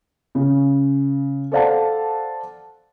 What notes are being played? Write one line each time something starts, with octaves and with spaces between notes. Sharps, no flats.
C#3
A4 C5 D5 F5 F#5 A5